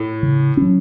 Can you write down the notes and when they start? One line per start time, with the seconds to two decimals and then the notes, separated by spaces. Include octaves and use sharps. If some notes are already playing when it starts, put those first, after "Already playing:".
Already playing: A2
0.23 C#3
0.57 F#3 C#4